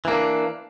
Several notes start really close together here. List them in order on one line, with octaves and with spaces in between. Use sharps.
E3 A#3 D4